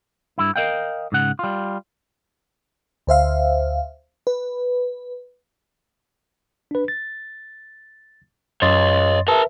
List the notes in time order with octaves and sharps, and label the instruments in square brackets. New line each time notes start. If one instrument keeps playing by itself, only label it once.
[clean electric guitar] G2 E4
A#4 D#5 F5 G5
G#2 C#3 F#5
G3 F4
[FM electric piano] D2 C5 E5 F5
B4
[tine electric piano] D4 B4
A6
[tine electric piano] F#2 C6 A6 [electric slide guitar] C#5 D#5
[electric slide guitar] A#4 A5 [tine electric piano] B4 E5